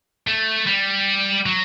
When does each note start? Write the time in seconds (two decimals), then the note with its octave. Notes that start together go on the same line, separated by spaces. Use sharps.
0.28 A3
0.67 G3
1.46 F#3